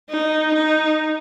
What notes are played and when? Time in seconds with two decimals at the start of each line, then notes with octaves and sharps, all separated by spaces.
0.10 D#4
0.55 D#4